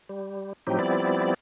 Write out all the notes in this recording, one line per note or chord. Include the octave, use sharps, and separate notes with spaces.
G3
A2 F3 F#3 C4 D#4 G4
F3 G3 B3 C4 E4 D5